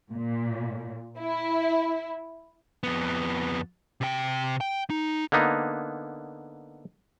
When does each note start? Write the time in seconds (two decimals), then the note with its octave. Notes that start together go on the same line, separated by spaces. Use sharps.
0.11 A#2
1.19 E4
2.83 F2 B3
4.01 C3 G5
4.61 G5
4.90 D#4
5.32 D3 A#3 B3 D#4